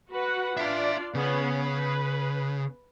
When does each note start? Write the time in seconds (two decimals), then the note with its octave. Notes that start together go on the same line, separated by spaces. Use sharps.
0.12 F#4 B4 F#5
0.57 D4 F4 D5 E5 C6
1.14 C#3 B3 C#4
1.60 B4